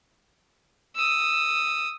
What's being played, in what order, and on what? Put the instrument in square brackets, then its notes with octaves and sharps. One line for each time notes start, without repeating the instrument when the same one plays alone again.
[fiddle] D#6 E6